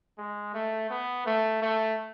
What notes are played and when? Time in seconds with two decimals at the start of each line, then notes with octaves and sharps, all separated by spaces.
0.18 G#3
0.54 A3
0.90 B3
1.26 A3
1.62 A3